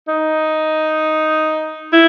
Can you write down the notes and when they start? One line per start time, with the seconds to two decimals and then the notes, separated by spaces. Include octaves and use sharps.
0.08 D#4
1.93 E4